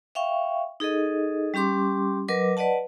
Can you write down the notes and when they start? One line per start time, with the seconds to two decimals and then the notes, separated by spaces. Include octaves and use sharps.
0.15 E5 F5 G5 C#6
0.80 D#4 G#4 A4 D#5
1.54 G3 C#4 G4 C6 D6
2.28 F#3 A#4 B4 D#5 D6
2.57 B4 D5 D#5 F#5 A5